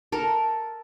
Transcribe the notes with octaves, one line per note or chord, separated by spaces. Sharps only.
A4 A#4